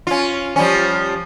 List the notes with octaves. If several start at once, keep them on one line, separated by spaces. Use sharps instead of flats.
C#4 F4
F3 G3 C#4